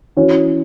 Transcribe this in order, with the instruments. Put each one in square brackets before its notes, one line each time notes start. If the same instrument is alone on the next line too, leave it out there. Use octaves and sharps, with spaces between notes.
[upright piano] E3 C#4 F#4 C#5